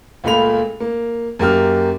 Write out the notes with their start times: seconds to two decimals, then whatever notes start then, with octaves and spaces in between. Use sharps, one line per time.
0.24 C#2 A#2 A3 F5 B5 F7
0.80 A#3
1.39 F#2 A#3 G4 F6